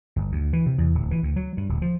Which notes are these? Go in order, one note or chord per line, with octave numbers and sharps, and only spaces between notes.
G1
D2
E3
C3
E2
D1
E3
D2
F#3
G2
D1
F3